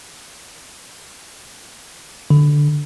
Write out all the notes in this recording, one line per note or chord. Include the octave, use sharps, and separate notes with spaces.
D3